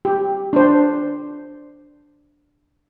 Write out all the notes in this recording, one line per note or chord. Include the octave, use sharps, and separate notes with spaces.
G4
D4 C5